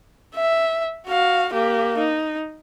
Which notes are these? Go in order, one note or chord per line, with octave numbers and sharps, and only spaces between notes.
E5
F#4 F5
A#3 G4
D#4